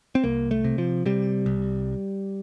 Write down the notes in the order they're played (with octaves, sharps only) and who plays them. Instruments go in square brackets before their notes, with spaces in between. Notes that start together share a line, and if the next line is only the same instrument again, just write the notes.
[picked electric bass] C4
C2 A#3
A3
C3
F3
C3 G3
C2